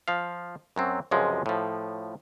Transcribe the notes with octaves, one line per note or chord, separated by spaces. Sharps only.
F3 F5
F#2 F#3 C4
C#2 F#2 C3 F3 G#3
A2 F3